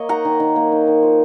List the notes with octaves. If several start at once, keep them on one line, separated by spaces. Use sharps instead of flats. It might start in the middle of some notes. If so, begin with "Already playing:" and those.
Already playing: A#3 C#5 D#5
D#4 F#5 A#5
D#3
D#3
A#3
D#4
D#3
F3